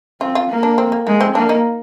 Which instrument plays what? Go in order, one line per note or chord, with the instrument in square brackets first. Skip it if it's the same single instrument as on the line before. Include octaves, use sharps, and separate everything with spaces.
[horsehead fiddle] C4 [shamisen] F4
[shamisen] F4
[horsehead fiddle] A#3
[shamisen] D4
C4
A#3
[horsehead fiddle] G#3 [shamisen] A#3
[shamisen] C4
[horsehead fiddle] A#3 [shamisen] D4
[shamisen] D#4